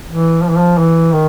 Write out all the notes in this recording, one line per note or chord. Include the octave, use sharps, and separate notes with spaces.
E3
F3
E3
F3
E3
D#3